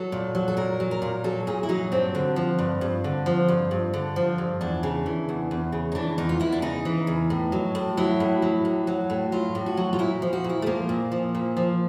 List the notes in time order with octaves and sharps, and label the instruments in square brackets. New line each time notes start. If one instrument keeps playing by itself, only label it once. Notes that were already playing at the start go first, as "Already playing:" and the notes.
Already playing: [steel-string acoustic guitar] F#3 A4
A#2
F#3
A4
A#2 A#4
F#3
A#4
A#2
F#3 A4
A#2 G#4
E4
F#3 D#4
G2 C4
D3
F3
G2
G2
D3
F3
G2
G2
D3
F3
G2
E2 D4
C#3
E3
E2
E2
C#3
D#4
E3 D4
E2 D#4
F4
E2 E4
D4
C#3 D#4
E3
E2
A2
F#3
A2
F#3 E4
A2
F#3
A2
F#3
A2
F#3 F4
A2
F#4
F#3
F4
A#2 E4
F3
F#4
A#2
E4
A3
F3 A#3
A#2
F3
A#2
F3